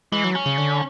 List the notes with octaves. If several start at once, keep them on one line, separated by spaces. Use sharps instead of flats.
E3 G#3
F#3
C#4
C#3
D3